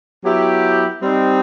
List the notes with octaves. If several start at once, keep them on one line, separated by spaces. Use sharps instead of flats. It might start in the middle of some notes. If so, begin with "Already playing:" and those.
F#3 B3 E4 G4
G3 C4 D#4